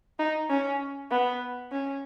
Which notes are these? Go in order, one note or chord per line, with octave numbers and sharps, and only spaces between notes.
D#4
C#4
B3
C#4